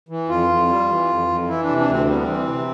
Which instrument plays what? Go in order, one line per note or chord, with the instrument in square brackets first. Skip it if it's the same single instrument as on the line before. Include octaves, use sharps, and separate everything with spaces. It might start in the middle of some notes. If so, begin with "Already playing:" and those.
[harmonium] E3
F2 F4
F2
G3
E3
F2
F2
E3 E4
D4
C3
D4
D2 C4
G3 C4
B3
E3 C4
C3